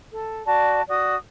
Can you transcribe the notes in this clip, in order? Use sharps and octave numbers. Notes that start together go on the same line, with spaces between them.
A4
F#4 D5 A5
F#4 D5 D#6